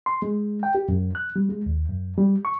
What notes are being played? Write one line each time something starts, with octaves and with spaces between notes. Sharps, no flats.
C6
G#3
G5
G4
F#2
F#6
G3
G#3
D#2
F#2
G3
C#6